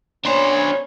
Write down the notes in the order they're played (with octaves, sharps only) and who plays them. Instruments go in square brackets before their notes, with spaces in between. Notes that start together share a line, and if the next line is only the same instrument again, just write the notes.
[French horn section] B3 C#4 C#5 [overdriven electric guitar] D4 C5